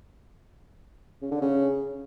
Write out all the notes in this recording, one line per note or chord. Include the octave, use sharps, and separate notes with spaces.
C#3
D3
C#3